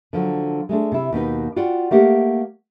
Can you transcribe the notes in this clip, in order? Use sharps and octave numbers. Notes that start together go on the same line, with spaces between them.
D3 F3 F#3
G#3 A3 D4
C3 E4
D#2 B2 D#4 B4
F4 F#4 D5 F#5 G5
A3 A#3 G4 F#5